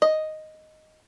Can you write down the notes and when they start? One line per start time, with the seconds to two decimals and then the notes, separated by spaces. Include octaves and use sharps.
0.02 D#5